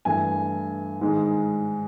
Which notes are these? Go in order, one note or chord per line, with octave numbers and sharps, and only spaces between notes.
G2 E3 A3 G#5
G#2 D#3 G#3